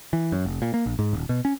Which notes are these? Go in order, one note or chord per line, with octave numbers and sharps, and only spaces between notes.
E3
F#2
F1
A#2
A#3
A#1
G#2
D#1
B2
C#4